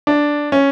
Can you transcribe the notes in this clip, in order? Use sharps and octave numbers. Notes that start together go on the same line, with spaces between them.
D4
C#4